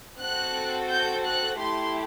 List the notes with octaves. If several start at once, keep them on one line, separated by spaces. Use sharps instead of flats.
C4 F#4 A4 F#6
G6
F#6
A3 E4 G4 C6